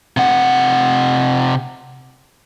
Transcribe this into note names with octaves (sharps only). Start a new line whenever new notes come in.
C3 F#5